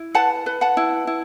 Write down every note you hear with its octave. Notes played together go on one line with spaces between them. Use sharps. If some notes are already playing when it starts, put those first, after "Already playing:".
Already playing: E4
B4 F#5 A5
B4
F#5 A5
E4
E4